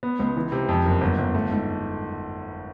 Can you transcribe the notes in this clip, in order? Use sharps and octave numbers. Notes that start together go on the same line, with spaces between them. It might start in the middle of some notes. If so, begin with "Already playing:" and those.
B3
C#2
E3
C3
F2
F#1
G1
G1
A3
G#2